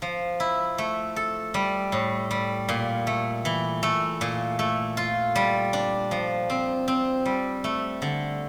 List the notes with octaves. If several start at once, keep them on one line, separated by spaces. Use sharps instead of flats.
F3
E4
A3
A4
G3
A2
G3
A#2
A3
E3
A3
A#2
A3
F4
G3
D4
F3
C4
C4
G3
A3
D3